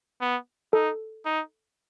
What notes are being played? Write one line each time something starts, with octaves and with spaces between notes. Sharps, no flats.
B3
D#4 A4
D#4